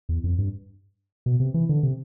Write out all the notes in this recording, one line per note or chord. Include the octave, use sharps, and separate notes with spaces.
E2
F2
G2
B2
C3
E3
D3
C3